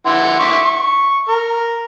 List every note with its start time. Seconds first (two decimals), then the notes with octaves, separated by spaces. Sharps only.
0.06 E3 F#5 C6
0.40 E5 C#6 D6
0.65 C#6
1.29 A#4